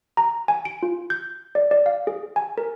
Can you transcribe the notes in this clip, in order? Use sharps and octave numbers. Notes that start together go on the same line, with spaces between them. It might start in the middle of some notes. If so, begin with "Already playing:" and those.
A#5
G#5
D7
F4
G6
D5
D5
F5
G#4
G#5
A#4